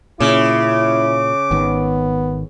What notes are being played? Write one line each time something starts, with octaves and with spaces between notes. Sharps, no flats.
A#2 C#3 E4 D6
G#1 D#3 B3